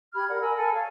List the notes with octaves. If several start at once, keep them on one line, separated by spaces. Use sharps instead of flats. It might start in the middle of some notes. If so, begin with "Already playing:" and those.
G4 B5 F6 G#6
A#4 D5 F#5
A#4 G#5 B5 E6
A4 G#5
C#5 F5